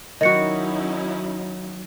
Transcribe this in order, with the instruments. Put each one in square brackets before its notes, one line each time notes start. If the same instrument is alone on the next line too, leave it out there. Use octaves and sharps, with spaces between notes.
[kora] D#3 F#4 [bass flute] F#3 [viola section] C#4 D#4 E4 [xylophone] D#5 C#7